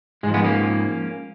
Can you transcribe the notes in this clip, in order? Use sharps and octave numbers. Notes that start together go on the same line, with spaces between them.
G#2 G#3
F3
G#3 B3
A#3 C#4